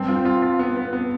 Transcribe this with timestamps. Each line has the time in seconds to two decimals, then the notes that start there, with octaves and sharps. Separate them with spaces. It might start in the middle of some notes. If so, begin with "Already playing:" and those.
Already playing: G2 C4
0.08 F4
0.16 C4
0.25 F4
0.42 F4
0.59 B3
0.77 B3
0.93 B3